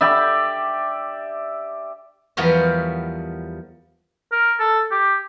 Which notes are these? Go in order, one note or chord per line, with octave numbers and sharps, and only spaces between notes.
G4 D5 E5
E2 F3 G3 B3 A#4 C#5
A#4
A4
G4